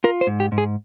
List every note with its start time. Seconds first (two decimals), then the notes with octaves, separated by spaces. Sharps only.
0.04 F4 A#4
0.21 C5
0.27 G#2
0.40 G4
0.52 G#2
0.58 G#4